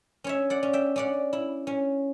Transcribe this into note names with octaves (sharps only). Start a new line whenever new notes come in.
C#4 C#5 E5
D5 F#5
C#4
E5 G5
C#4 D5 F#5
E4
C#4